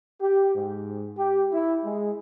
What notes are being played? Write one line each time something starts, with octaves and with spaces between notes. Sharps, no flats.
G4
G#2
G4
E4
G#3